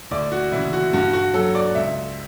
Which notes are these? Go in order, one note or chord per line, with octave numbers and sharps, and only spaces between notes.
D2 D5
F#4
C#3 E3 E4
F#4
G2 F#4
F#4
F#3 A4
D5
C#2 E5